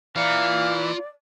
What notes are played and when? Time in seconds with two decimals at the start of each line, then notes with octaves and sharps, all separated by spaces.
0.16 E3 F4 D5 F5 A#5